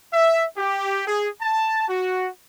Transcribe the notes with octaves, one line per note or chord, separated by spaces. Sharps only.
E5
G4
G#4
A5
F#4